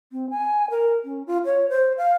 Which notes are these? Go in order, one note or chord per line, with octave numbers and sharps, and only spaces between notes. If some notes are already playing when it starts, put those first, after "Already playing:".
C4
G#5
A#4
C#4
F4
C#5
C5
F5